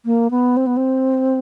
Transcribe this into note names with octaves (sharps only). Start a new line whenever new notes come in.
A#3
B3
C4
B3
C4